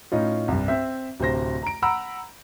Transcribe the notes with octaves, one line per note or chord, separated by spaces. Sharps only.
A2 C#4 D#4 F4
C2 G2
C4 E5
D1 C3 C5 A#6
A#5 D7
F#5 A#5 B5 E6